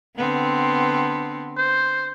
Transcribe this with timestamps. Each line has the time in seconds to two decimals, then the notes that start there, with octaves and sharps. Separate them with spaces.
0.16 D3 B3 C4
1.57 C5